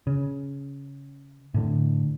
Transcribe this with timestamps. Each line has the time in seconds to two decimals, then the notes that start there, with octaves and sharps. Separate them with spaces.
0.07 C#3
1.54 A2 D3